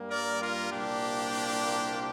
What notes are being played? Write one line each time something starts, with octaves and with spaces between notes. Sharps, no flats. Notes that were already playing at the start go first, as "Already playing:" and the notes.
Already playing: G2 G3 A#3
A#4 D5
F4 A#4
C2 A#2 A#3 D4 G4